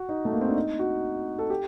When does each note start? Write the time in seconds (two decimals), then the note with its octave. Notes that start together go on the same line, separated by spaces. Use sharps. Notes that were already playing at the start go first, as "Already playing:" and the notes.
Already playing: F#4
0.09 D#4
0.25 A3
0.33 A#3
0.41 C4
0.48 D4
0.55 D#4
0.79 F#4
1.39 A4
1.50 G4